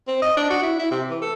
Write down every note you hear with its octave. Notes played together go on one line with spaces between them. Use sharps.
C4
D#5
D4
F#4
E4
E4
C3
E3
A4